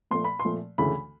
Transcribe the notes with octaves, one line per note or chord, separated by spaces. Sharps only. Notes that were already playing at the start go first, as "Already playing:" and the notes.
A#2 F3 A3 C6
B5
C6
A#2 F3 A3
D2 C#3 E3 A3 B5